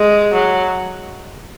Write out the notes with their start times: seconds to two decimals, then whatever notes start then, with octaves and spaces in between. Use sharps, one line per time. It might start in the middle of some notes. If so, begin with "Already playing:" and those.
Already playing: G#3
0.33 F#3